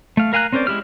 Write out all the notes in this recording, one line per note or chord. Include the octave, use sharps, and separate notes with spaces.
A3 F5
A#4 F5 G#5 A#5 F#6
C4 C#4 A#4 C5 D5
G#3 E4 G4 F6